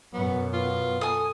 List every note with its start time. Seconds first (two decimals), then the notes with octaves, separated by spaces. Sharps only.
0.13 F#2 B2 B3
0.53 B3 F4
1.01 A4 G#5 D#6